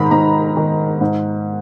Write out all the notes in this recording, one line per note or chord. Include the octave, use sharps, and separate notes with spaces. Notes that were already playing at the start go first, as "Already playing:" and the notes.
Already playing: G#2 D#3 A#5 B5
G#2 A#5
D#3
G#2